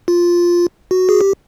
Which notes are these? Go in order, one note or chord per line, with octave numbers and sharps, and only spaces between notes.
F4
F#4
G#4
G4